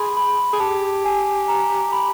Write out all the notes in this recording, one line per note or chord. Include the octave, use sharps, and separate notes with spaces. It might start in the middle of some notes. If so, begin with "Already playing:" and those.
Already playing: G#4 B5 C6
B5
G#4
G4 A5
G#5
A#5
B5